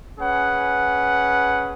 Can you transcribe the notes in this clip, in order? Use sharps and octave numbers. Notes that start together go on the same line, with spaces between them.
C#4 G#4 B4 F#5